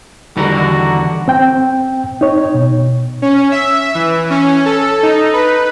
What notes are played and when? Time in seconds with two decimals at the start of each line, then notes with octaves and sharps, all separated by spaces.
0.37 E2 D3 D#3 G3 E4 F#4 A#4
1.28 C4 G5
2.21 D#4 C#5
2.54 B2
3.22 C#4
3.52 E5
3.95 E3
4.30 C#4
4.66 A4
5.03 D#4
5.33 B4